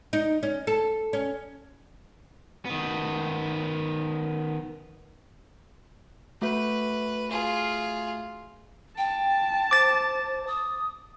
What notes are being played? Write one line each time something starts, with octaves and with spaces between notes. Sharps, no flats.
D#4
C#4
A4
C#4
D#3 B3
A3 F#4 B4 E5
F4 G#4
G5 A5
C5 D6 A6
D#6